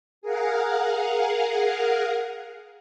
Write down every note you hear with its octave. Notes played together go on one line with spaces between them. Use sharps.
G#4 A#4 F5 F#5